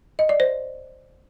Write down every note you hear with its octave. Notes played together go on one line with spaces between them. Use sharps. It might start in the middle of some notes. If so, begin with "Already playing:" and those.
D#5
D5
C5